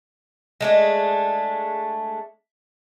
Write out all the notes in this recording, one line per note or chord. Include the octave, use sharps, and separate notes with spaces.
G#3 A3 D4